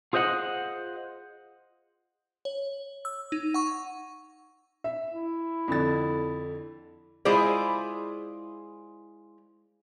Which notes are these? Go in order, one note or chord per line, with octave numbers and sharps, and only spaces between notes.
F4 G#4 C5 D#5 F#5
C#5
E6
D#4
F#5 C#6
E5
E4
F2 D3 A6
G#3 E4 F4 G#4 C5 D5